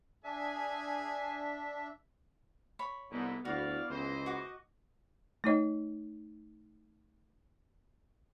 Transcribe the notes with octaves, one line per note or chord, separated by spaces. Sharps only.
D4 G#4 E5 G#5
C#5 B5
C2 G#2 D3 B3 E4
D2 B3 E4 F#4 D5 F5
C#2 E3 C5 D#5
F#4 F#5 D6
A3 D#4 C#5 D#5